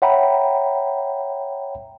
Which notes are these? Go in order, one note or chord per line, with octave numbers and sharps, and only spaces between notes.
C#5 E5 F#5 G5 A#5 B5